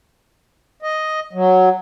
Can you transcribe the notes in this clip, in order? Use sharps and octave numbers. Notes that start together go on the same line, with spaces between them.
D#5
F#3